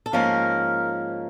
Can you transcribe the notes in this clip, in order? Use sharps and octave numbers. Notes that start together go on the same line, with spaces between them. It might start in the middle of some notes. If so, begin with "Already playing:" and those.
A4
G#2 F3 A#3 C#4 A#4